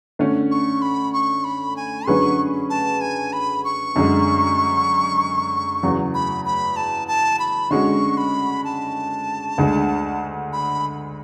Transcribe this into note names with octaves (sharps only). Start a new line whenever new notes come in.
D3 A3 C#4
C#6
B5
C#6
B5
G#5
D3 F#3 C#4 G#4 B4 C#6
A5
G#5
B5
C#6
F#2 D3 G#3
E2 C#3 F#3
B5
B5
A5
A5
B5
D3 G#3 C#4 F#4 C#6
B5
A5
D2 D3 G#3
B5